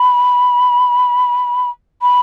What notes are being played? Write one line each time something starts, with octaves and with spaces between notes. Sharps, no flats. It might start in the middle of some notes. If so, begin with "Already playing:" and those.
Already playing: B5
B5